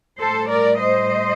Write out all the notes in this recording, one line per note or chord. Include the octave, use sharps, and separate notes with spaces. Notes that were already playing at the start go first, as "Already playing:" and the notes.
A2 G3 A4 C5
A#4 D5
C5 D#5